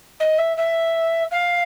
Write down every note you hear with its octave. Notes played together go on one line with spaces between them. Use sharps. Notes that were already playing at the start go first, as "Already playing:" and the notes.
D#5
E5
E5
F5